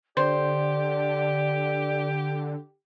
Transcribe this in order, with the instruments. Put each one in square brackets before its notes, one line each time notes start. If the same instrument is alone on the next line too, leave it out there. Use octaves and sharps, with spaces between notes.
[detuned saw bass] D3 [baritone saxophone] G4 [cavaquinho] C5 [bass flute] D5